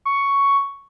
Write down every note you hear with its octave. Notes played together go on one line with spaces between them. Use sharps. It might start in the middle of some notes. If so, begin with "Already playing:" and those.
C#6